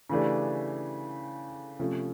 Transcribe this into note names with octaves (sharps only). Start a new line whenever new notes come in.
C#3 E3 A3 D4 G4
C3 F3 A3 C#4